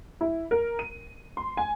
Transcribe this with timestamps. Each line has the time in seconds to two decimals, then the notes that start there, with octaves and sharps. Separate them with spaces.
0.21 E4
0.51 A#4
0.79 D#7
1.37 C6
1.57 G#5